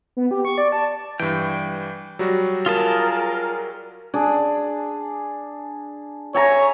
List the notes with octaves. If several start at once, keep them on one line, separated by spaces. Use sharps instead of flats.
B3
G4
C#6
D5
A5
G2 E3 G5
F#3 G3 F#4
F4 G#4 A#4 A5
D4 G#4
C#5 E5 G#5 A#5